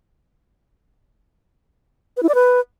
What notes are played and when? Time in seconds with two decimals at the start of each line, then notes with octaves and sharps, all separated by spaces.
2.17 B4
2.23 E4
2.29 D5
2.35 B4